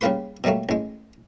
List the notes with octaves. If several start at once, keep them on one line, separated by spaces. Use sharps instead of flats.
C#3 G3 A#3 F4 B4 C6
B2 F#3 G3 A3 A#3
A1 G#3